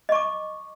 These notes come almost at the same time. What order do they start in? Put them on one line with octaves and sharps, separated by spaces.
D#5 C#6 D6